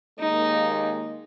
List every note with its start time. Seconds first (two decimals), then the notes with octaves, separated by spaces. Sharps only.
0.19 D#2 G#3 A#3 D#4